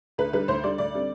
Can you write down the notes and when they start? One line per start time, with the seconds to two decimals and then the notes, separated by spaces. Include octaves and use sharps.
0.18 D2 B4
0.33 D3 G3 B4
0.48 D2 C5
0.63 D3 G3 D5
0.78 D2 D5
0.94 D3 G3 C4